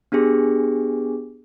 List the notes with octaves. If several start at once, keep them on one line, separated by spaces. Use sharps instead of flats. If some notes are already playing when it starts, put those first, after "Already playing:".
B3 D4 G4 G#4